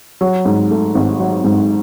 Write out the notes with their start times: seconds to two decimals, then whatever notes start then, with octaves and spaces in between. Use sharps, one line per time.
0.21 F#3
0.45 G#2
0.71 A3
0.95 G#1
1.19 F#3
1.44 G#2